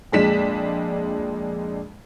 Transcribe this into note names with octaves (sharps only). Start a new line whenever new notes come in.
F2 A#2 G#3 D4 B6 E7